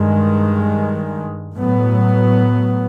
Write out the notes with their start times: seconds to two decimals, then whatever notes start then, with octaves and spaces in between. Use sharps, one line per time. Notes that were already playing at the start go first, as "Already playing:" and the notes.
Already playing: G2 D#3 G#3
1.56 A2 F#3 B3